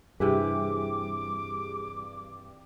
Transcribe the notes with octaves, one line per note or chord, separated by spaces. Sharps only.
G2 C3 E3 G4 G#4 B4 D6